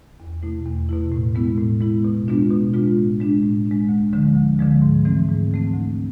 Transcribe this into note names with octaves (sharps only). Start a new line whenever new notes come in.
E2
B2 A3 E4
E2
B2 A3 E4
A2
G#3 B3 E4
A2
G#3 B3 E4
B2
G#3 B3 D4 F4
B2
G#3 B3 D4 F4
A2
G#3 D4
A2
D4
G#3
D2
D3 F3 G#3
D2
D3 F3 G#3
G#2
E3 A3 C4
G#2
E3 A3 C4
D2